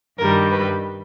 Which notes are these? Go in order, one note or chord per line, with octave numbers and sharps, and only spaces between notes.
G2 D#3 G3 A#4
B4